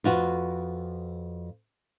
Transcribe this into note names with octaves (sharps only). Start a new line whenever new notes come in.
F2 F4 F#4 B4